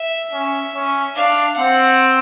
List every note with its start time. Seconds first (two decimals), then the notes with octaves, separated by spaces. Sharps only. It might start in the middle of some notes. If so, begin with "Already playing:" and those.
Already playing: E5
0.31 C#4
0.73 C#4
1.15 D4 F5
1.57 C4 F#5